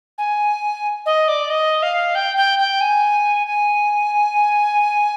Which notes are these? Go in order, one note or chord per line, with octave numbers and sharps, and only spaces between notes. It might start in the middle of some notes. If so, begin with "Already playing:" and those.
G#5
D#5
D5
D#5
F5
G5
G5
G5
G#5
G#5